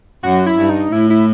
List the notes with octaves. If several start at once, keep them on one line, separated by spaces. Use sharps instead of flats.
F#2 F#4
E4
G2
D#4
A2 E4
E4